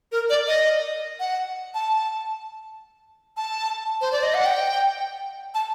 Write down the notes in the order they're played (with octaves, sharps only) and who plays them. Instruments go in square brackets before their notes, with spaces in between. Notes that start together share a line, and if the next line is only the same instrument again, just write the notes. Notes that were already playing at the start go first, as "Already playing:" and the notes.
[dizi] A#4
D5
D#5
F#5
A5
A5
C5
D5
D#5
F#5
G5
A5